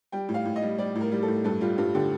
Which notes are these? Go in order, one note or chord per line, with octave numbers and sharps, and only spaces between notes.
G3 G5
A2
F5
A2
D#5
G3
G3 D5
A2
A#4
G3
A4
A2
G2 A4
G3 F4
G2 F4
D3 G4